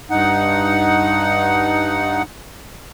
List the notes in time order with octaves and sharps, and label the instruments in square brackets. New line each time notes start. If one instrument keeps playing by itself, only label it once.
[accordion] G2 D#4 F#5